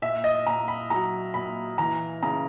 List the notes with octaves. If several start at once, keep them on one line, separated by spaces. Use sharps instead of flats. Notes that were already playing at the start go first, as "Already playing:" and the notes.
A#2 E5
D#5
A#2 A#5
B5
F#3 A#5
A#2 B5
E3 A#5
C#3 A#5